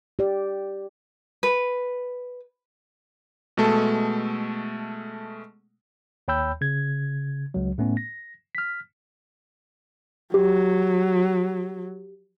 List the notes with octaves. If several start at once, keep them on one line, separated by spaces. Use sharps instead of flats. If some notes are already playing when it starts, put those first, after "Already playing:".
G4 D5
B4
B2 G#3 A3 A4
D#2 C#5 G5 B5 E6 G6
C#3 G#6
C#2 F#3
A2 A3 B3 C#4
A#6
F6 B6
F#3 G4